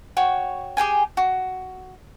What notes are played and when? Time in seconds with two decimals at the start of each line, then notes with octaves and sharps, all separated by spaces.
0.17 F#4 C#5 G5
0.77 G4 G#4 G5 G#5
1.17 F#4